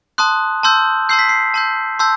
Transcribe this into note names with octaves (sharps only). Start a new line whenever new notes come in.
A5 C6 D#6 F#6
A5 C6 E6 G6
A5 C6 E6 G6 C7
B6
C7
A5 C6 E6 G6
A5 C6 E6 G6